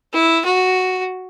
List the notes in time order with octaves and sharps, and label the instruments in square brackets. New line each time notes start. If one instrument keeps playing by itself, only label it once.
[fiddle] E4
F#4